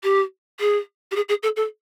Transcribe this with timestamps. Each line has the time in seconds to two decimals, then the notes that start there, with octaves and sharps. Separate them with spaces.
0.04 G4
0.60 G#4
1.11 G4
1.16 G#4
1.29 G#4
1.43 A4
1.56 A4